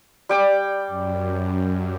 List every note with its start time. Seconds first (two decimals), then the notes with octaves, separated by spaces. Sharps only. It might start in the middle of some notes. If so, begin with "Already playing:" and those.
0.29 G3 G5 D6
0.87 F#2